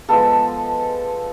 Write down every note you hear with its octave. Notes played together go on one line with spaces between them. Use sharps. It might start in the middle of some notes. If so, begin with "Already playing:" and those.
F3 G#3 B3 A4